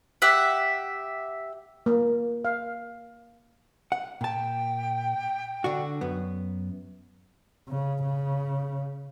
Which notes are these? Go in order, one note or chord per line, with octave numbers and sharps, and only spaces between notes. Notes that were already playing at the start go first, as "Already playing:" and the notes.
G4 E5 F#5
A#3
F5
F#5
A#2 G5 A5
D3 D4 F#4
F#2 B3
C#3
C#3